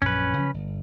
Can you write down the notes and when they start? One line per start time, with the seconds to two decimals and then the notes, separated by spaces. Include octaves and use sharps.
0.02 A#1 F#2 C#4 B4
0.38 C#3 F3 F#3
0.54 G1